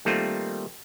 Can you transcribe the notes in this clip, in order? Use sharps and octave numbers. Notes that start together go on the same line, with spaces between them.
D#3 G3 A3 A#3 C4 F4